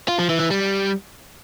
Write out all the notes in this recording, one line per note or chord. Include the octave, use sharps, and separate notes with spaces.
F4
F3
E3
E3
G3